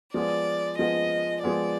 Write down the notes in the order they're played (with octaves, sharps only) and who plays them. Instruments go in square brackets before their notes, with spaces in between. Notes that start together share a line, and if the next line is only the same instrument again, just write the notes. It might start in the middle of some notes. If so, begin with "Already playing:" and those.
[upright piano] F3 G#3 B3 [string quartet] D5
[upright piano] F3 G#3 B3 [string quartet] D#5
[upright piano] F3 G#3 B3 [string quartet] D5